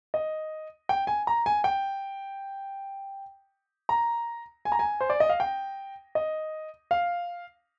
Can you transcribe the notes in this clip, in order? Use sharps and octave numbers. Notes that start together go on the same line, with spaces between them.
D#5
G5
G#5
A#5
G#5
G5
A#5
G#5
A#5
G#5
C5
D5
D#5
F5
G5
D#5
F5